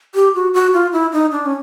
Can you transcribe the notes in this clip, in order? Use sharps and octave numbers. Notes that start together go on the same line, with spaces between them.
G4
F#4
F#4
F4
E4
D#4
D4
C#4